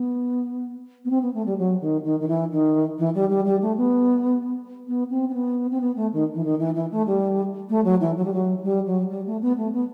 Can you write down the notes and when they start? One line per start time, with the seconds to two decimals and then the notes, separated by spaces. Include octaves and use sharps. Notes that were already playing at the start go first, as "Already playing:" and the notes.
Already playing: B3
1.04 B3
1.10 C4
1.22 B3
1.33 A3
1.45 G3
1.57 F#3
1.80 D#3
2.03 D#3
2.19 D#3
2.27 E3
2.51 D#3
2.98 E3
3.14 G3
3.29 G3
3.45 G3
3.61 A3
3.77 B3
4.87 B3
5.10 C4
5.29 C4
5.33 B3
5.70 C4
5.80 B3
5.95 A3
6.12 D#3
6.33 E3
6.44 D#3
6.59 E3
6.74 E3
6.91 A3
7.06 G3
7.69 A3
7.84 F#3
8.00 E3
8.16 F#3
8.24 G3
8.33 F#3
8.63 G3
8.86 F#3
9.09 G3
9.26 A3
9.41 B3
9.57 A3
9.72 B3